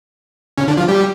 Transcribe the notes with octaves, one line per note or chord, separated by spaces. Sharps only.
C#3 C#4
D3 D4
F3 F4
G3 G4